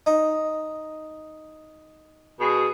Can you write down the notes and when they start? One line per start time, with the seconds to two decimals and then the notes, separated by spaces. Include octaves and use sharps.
0.06 D#4
2.40 B2 G#4